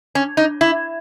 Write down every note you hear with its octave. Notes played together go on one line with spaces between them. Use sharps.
C#4
D#4
E4